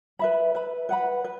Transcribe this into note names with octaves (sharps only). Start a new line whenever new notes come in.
B4 E5 B5
B4 E5 B5
B4 F#5 B5
B4